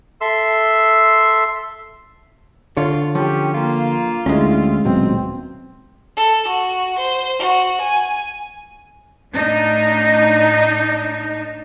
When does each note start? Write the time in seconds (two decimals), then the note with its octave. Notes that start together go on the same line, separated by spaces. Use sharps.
0.21 A4 E5 C6 E6
2.77 D3 F4 C#5
3.15 F3 C#4 G4
3.54 A#3 F4
4.26 D2 G#3 C#4 E4
4.85 D#1 B2 F#3 C4
6.17 A4
6.48 F#4
6.99 C5
7.39 F#4
7.81 G#5
9.34 A2 D4 D#4